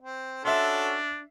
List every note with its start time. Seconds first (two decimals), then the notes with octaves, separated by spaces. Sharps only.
0.01 C4
0.45 C#4 D4 F#4 A4 E5 C6